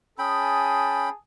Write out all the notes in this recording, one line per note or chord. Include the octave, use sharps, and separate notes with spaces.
C#4 G#4 G5 A5 B5 D#6